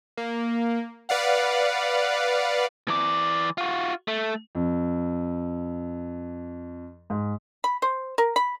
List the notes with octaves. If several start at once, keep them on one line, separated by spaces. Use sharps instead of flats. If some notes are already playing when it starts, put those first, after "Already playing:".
A#3
B4 D5 F5 F#5
E3 D5
F4 F#4
A3
F2
G#2
B5
C5
A#4
B5